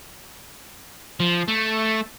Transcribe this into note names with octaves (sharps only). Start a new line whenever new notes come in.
F3
A3